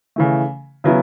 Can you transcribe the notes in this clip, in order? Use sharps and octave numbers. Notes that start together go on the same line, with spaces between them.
C#3 E3 A3
C#3 F#3 B3 E4